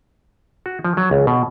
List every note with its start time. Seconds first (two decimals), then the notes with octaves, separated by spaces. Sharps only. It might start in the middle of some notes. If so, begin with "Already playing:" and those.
0.66 F#4
0.84 F3
0.97 F#3
1.11 C#2
1.27 B2